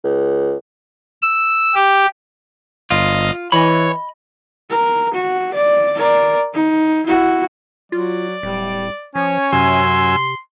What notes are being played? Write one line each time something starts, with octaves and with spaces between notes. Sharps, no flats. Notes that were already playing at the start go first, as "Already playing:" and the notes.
C#2
E6
G4
G1 F4 D#5 F5
E3 C#5 D#5 B5
A#4
F#4
D5
A#4 D5
D#4
E4 F#4
F#3 F4 D5
D1 G3
F3 C#4 C#5
F#2 C3 G#5 C6 E6